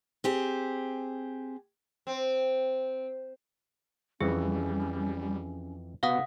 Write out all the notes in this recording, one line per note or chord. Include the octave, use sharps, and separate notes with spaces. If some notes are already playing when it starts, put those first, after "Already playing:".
C4 G4 G#4
C4
F2 E3 G3 C#4 G#4
C3 B3 F#4 F5 F#5 D#6